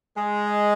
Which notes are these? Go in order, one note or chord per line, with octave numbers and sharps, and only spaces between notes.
G#3